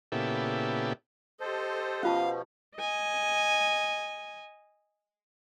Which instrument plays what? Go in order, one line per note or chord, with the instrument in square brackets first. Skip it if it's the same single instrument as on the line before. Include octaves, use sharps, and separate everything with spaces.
[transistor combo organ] A#2 C#3 B3 E4 G4 A4
[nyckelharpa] G4 D#5 [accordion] A4 C5
[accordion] B2 F3 [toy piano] C#4 F4 A5 [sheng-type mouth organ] F5
[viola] D#5 G#5